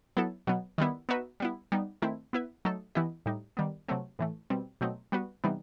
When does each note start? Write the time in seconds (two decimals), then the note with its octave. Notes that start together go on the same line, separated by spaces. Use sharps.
0.17 F#3 B3 E4 A4
0.47 B2 F#3 B3
0.78 D#3 G3 B3 E4
1.09 B3 D#4 F#4 B4 E5
1.40 G3 B3 E4
1.72 G3 B3 D#4
2.02 D#3 A3 C4 E4
2.33 B3 E4 B4 E5
2.65 F#3 A3 D#4 A4
2.95 E3 B3 E4 G4 D#5
3.26 A2 G3 D#4
3.57 D#3 G3 B3
3.88 C3 F#3 A3 C4
4.19 A2 E3 A3
4.50 B2 G3 C4
4.81 B2 F#3 A3 C4 D#4
5.12 G3 B3 F#4 B4
5.44 C3 E3 G3 B3 D#4